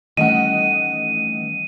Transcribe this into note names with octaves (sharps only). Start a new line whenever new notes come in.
D#3 E3 G3 A3 C#4 D#5 F#5 D#7